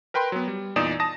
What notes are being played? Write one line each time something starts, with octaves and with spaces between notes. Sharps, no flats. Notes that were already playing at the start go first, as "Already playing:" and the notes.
A#4 B4 G5 B5 C6
F#3 B3
G3
E2 A#2 D#4 D5 D#6 E7
A5 D#6 A#6